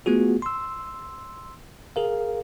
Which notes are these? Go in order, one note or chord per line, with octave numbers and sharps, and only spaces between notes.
A3 B3 F4 F#4 G#4
C6 E6
G#4 A#4 F5